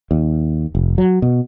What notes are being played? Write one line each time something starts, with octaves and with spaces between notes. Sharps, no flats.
D#2
F1
F#3
B2